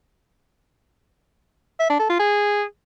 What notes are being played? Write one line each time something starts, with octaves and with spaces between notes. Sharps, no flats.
E5
D4
A4
F4
G#4